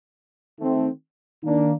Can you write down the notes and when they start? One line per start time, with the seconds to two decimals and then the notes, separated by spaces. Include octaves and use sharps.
0.58 D#3 A3 C4
1.42 D#3 A#3 D4